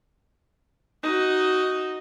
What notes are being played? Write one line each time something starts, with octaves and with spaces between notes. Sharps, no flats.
D#4 F#4